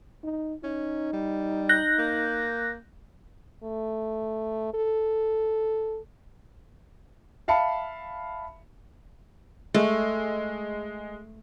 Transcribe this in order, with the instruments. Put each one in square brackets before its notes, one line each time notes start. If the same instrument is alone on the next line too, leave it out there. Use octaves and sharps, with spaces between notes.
[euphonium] D#4
[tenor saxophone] C#4 [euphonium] D#4
[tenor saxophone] G3
[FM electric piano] F#6 G6 A#6
[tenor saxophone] A#3
[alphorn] A3
A4
[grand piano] E5 F5 A5 B5 C#7
[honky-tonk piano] G#3 [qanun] A3